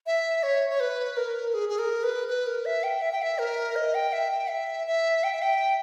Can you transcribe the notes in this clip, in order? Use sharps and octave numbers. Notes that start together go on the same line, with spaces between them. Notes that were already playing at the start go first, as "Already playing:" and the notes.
E5
C#5
C#5
B4
A#4
G#4
G#4
A#4
B4
B4
A#4
E5
G5
E5
G5
E5
A#4
D#5
G5
E5
G5
E5
E5
G5
E5
G5